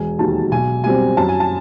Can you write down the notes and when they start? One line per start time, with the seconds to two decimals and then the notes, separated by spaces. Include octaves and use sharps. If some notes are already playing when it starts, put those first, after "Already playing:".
Already playing: E1 G#5
0.19 D#2 D#3 F#3 A5
0.52 B1 G#5
0.84 B2 G3 C4 G#5
1.17 F#2 A5
1.29 G#5
1.40 A5